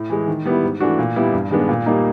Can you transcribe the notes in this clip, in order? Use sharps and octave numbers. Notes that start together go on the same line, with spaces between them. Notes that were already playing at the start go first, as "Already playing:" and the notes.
Already playing: A2
E3 G#3
D#3
G3 B3 E4
G#2
E3 A3 D4 F#4
A#2
G3 B3 E4
G2
D#3 G#3 B3 D4
A#2
G3 A#3 D#4